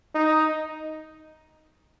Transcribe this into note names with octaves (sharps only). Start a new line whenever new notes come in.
D#4